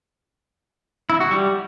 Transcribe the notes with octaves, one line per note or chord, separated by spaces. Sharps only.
E4
F#4
G3